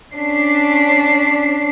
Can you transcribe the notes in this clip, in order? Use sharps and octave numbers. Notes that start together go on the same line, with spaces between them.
C#4 D4 B6 C7